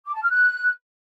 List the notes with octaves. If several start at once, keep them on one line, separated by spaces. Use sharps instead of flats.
D6
A5
F6
F#6